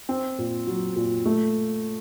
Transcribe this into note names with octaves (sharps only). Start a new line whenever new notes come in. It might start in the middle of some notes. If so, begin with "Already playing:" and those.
C4
A#2
F#3
A#2
A3